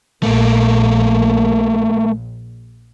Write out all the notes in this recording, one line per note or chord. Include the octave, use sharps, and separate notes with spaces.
A#1 A#2 A3 A#3